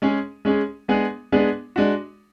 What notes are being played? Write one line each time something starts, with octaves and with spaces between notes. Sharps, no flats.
G#3 C#4 G#4
G#3 C#4 G#4
G#3 B3 D4 G#4
G#3 B3 D4 G#4
G#3 D4 F#4